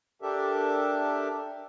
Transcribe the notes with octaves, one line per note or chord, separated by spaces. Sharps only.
D4 G4 A4 A#4 E5